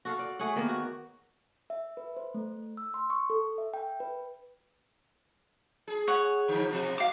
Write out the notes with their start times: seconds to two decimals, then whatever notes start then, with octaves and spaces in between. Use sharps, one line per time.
0.05 F#4 A4 F5
0.19 D5
0.39 A3 G#4 C#5 F#5
0.56 D#3 A#3 B3
0.68 F#4
1.70 E5
1.97 B4
2.17 C5
2.34 A3
2.77 E6
2.94 C6
3.10 C#6
3.30 A4
3.58 E5
3.74 G5
4.00 B4
5.87 G#4
6.08 C#5 F#5
6.48 D3 F3
6.71 B2 F3 F#4
6.98 F5 D6